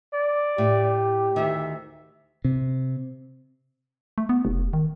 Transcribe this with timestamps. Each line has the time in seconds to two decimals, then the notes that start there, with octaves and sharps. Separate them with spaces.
0.13 D5
0.58 A2 G4
1.36 D2 D#3 E5
2.45 C3
4.18 A3
4.29 B3
4.45 F1
4.73 D#3